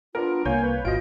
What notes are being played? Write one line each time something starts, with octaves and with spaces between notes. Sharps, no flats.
B3 D4 F4 A#4
C2 A#3 C#5 F5 G#5 G6
B4
G#1 F4 F#4 D#5 D7